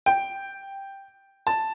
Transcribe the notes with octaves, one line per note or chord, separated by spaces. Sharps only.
G5
A5